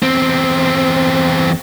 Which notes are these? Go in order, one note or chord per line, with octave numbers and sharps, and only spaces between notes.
E2 C4